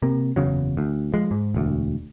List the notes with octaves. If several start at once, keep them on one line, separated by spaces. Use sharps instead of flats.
C3 A#3
F#1 E2 C#3 F#3
D2
F3 G#3
G#2
E1 D2